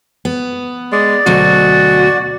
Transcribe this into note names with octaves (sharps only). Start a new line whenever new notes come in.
B3
G#3 D5
D2 B2 F#3 F#4